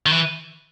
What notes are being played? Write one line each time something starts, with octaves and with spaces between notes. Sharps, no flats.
D#3
E3